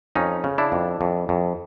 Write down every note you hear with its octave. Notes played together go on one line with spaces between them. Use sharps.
F2 C#4 D#4
C#3
D4 E4
F2
F2
F2